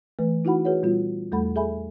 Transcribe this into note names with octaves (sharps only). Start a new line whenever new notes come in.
E3 A3 B4
D#4 E4 F#4 F#5 B5
F#4 G#4 B4 C#5 F#5
A#2 G3 B3 F4
E2 G3 A3 A4 F#5 B5
G#4 A4 E5 G#5 B5